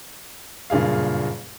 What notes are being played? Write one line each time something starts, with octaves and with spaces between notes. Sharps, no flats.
F#1 G2 A#2 G#4 F5